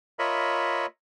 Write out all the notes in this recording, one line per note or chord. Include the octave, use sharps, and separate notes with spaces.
F4 A#4 C#5 D#5 E5 B5